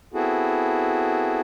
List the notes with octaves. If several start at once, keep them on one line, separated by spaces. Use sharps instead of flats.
B3 C4 E4 F#4 G#4 A4